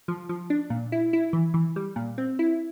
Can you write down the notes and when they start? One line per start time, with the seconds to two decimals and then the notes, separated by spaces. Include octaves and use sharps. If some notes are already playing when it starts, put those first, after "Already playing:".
0.08 F3
0.29 F3
0.50 D4
0.70 A#2
0.92 E4
1.13 E4
1.33 E3
1.54 E3
1.76 G3
1.96 A#2
2.18 C4
2.39 E4